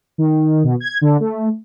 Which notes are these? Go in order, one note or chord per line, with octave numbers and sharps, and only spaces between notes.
D#3
B2
G#6
D3
A3